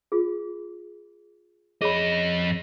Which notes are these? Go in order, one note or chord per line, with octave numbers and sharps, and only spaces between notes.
F4 G#4
F2 G#4 C#5 D#5 B5